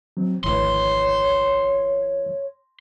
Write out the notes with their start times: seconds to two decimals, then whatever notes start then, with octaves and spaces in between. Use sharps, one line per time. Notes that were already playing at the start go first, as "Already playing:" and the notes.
0.17 F#3 C4
0.44 G#1 D2 F3 E4 B4 C#5 C6